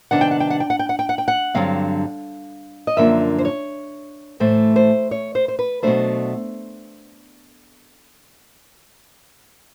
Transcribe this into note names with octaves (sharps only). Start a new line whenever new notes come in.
C3 D#3 G3 B3 D4 F#5
G5
F#5
G5
F#5
G5
F#5
G5
F#5
G5
F#5
G5
F#5
G2 D3 F#3 C4 F5
D#5
F#2 D3 F3 A#3 D4 E5
C5
C#5
A2 E3 A3 C5
C5
C#5
C5
C5
B4
B2 F#3 A3 D4 C5